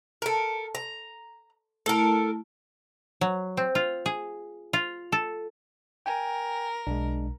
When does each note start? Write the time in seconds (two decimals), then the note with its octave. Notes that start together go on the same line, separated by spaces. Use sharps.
0.22 A4 A#4
0.75 A#5
1.86 A3 E4 A4 A#4
3.21 F#3
3.57 C4
3.75 F4
4.06 G#4
4.73 F4
5.12 A4
6.06 A#4 G5 G#5
6.87 B1 G#3 D4